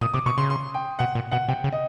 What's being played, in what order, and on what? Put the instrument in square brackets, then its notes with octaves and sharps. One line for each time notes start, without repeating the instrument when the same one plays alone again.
[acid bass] A#2 [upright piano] D#6
[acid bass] C3 [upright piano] D6
[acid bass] B2 [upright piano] C#6
[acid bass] C#3 [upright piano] C6
[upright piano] C6
G5
[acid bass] B2 [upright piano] F#5
[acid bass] A#2
[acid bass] B2 [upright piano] F#5
[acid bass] C3 [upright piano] G5
[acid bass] C#3
[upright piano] D#5